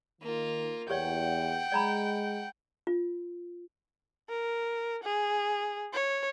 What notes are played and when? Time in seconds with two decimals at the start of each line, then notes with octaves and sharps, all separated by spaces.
0.22 D#3 A#3 F4
0.90 E2 G4 C#5 D5 F#5 G5
1.72 G#3 D5 A#5 B5
2.87 F4
4.29 A#4
5.03 G#4
5.93 C#5